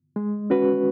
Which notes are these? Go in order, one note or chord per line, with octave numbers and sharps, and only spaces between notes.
G#3
C#4 F#4 B4